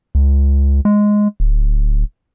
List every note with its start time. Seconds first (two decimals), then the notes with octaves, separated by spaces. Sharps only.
0.15 C#2
0.85 G#3
1.40 D1